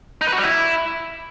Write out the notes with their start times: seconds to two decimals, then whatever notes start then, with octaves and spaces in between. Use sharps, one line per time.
0.21 D#4
0.27 B4
0.32 F#4
0.38 G3
0.43 E4